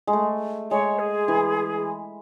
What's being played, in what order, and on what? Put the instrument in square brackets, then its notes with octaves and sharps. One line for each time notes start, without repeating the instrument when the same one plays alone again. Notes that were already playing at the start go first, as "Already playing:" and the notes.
[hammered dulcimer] G#3
A3
[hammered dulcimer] G#3 [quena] C#5
[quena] G#4
[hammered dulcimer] E3